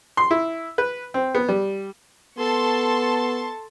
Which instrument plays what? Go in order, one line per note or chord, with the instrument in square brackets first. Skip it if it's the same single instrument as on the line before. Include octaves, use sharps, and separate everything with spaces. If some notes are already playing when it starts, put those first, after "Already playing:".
[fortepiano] C6
E4
B4
C4
B3
G3
[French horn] B3 [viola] A4 [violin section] A5 C6 C#6